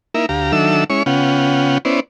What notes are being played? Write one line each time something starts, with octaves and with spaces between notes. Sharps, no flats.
A#3 D#4 E4 A#4 E5
D2 G4 F5 A#5
D#3 F#3 D4 A4 E5 E6
G#3 C#4 E4 C#5 C#6
C#3 B3 C#4 F4 F#5 G5
B3 C#4 E4 C5 D5